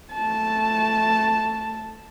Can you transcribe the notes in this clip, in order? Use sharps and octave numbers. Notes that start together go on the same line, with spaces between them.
A3 A5